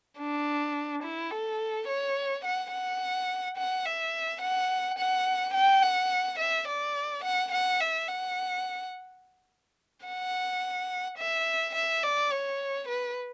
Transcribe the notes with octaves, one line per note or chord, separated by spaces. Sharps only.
D4
E4
A4
C#5
F#5
F#5
F#5
E5
F#5
F#5
G5
F#5
E5
D5
F#5
F#5
E5
F#5
F#5
E5
E5
D5
C#5
B4